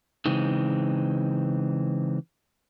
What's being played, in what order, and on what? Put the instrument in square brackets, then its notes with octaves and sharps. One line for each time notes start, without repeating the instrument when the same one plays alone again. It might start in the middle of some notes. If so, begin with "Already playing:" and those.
[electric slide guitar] C#3 E3 G#3 C4 D#4